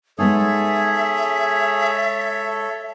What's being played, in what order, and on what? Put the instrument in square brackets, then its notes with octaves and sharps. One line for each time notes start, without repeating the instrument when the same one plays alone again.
[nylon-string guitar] G#3 B3 D#4 [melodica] G#4 [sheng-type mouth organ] A4 C#5 [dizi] E5